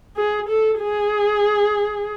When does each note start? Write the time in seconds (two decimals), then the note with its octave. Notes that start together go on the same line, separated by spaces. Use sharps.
0.17 G#4
0.49 A4
0.80 G#4